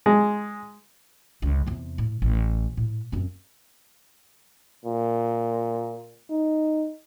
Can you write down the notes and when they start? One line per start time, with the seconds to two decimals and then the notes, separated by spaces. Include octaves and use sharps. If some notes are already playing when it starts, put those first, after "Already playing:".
0.06 G#3
1.42 C#2 D3
1.66 E2 C3
1.98 A2
2.22 A1
2.77 A2
3.12 F#2 C4
4.85 A#2
6.31 D#4